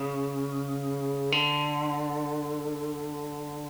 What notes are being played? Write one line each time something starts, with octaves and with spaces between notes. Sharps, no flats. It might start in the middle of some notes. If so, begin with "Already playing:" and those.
Already playing: C#3
D3